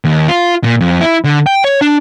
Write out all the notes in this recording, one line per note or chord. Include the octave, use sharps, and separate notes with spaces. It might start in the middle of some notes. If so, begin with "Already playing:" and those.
D#2
F4
A#2
F2
E4
D3
G5
C#5
D4